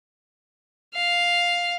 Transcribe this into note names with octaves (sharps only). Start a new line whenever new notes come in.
F5